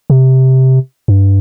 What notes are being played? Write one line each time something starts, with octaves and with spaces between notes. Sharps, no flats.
C3
G2